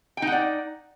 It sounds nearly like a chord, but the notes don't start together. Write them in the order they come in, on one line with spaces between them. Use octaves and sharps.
G5 D#4 F#5 D5